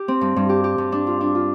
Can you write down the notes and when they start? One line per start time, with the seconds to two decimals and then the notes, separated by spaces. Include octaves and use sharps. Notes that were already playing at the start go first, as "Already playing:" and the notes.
Already playing: G4
0.08 C4
0.21 G2
0.36 G2
0.49 G4
0.64 G4
0.78 G2
0.92 D4
1.07 F4
1.21 D4
1.35 F4